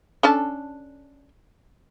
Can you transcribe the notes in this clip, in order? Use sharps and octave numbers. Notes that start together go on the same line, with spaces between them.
C#4 D4 A4